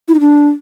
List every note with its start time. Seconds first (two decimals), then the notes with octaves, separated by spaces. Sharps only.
0.08 E4
0.14 D#4
0.20 D4